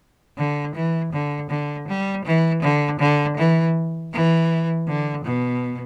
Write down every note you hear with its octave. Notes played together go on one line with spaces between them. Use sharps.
D3
E3
D3
D3
G3
E3
D3
D3
E3
E3
D3
B2